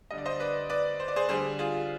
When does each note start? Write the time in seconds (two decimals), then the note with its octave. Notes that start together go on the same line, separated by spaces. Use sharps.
0.11 D3 G3 D#5
0.18 D5
0.25 C5 D#5
0.40 B4 D5
0.70 B4 D5
1.00 C5
1.08 D5
1.16 G#4 C5
1.29 D3 G3 G#4 C5
1.59 F4 G#4